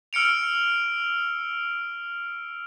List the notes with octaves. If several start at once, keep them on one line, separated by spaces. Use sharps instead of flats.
E6 F6 C#7 D7 F7